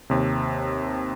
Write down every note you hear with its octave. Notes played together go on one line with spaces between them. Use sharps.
D#2 C3